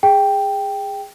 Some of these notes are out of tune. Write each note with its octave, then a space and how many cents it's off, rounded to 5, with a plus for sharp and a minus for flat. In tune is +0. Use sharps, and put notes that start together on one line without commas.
G#4 -15 G5 +0